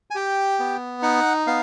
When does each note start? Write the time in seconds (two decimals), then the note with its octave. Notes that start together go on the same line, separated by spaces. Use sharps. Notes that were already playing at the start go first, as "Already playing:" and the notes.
0.11 G#5
0.15 G4 G5
0.59 B3
1.02 D#4 F#5
1.47 B3 F5